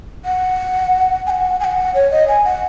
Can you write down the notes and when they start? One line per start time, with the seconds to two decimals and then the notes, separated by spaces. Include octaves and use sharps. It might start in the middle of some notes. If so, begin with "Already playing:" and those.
0.25 F#5
1.27 G#5
1.30 F#5
1.60 G#5
1.65 F#5
1.95 C#5
2.11 D#5
2.28 G#5
2.45 F#5